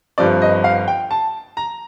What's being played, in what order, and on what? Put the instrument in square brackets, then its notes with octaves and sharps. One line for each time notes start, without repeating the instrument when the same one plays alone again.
[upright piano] G1 G2 F3 C4 D5
D#5
F5
G5
A5
A#5